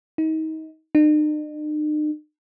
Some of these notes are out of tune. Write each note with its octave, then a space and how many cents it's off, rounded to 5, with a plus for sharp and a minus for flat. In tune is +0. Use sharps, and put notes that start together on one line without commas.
D#4 +30
D#4 -45